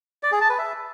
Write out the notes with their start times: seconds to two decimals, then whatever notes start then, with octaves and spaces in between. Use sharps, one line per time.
0.23 D5
0.32 G#4
0.41 A5
0.50 B4
0.59 E5